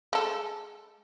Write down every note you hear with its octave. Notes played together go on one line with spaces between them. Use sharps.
G#3 A4